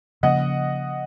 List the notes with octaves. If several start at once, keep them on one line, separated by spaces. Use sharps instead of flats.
C#3 F3 A#3 C#4 D#5 F#5